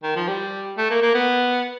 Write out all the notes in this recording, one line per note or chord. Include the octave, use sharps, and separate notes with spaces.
D#3
F3
G3
A3
A#3
A#3
B3